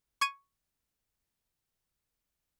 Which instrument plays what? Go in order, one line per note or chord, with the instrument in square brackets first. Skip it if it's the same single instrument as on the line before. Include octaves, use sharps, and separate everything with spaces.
[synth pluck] C#6 G#6 D#7